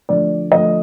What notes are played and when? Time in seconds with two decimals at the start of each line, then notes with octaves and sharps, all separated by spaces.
0.09 D3 F3 A3 D5
0.52 D3 F3 A3 D#5